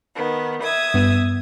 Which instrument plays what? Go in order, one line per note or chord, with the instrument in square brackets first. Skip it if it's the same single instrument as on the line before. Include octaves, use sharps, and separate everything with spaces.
[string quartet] D#3 B3
E5 D#6 G#6
[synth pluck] G2 B3